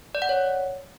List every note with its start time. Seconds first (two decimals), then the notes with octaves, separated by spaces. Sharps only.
0.15 D5
0.22 F#5
0.29 C#5